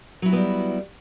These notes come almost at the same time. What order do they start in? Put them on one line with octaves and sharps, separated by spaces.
F#3 E4 F#4 B3 G3